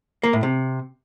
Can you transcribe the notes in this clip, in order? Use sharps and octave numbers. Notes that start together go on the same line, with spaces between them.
A#3
A2
C3